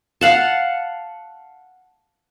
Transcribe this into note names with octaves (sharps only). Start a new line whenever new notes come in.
F5 F#5 A5